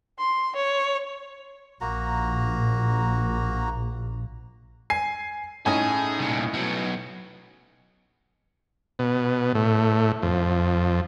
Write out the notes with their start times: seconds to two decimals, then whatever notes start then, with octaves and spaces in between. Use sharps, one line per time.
0.19 C6
0.56 C#5
1.81 A#1 A#3 F#4 A#5
4.90 G#5 C7
5.66 A2 C#4 D#4 G#4
6.19 C2 A#2
6.54 B2 F#3
8.99 B2
9.55 A2
10.22 F2